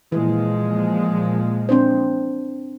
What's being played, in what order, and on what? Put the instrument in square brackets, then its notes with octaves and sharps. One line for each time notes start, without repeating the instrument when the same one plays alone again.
[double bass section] A#2 F3 G#3 [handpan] E3
[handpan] C4 D4 C5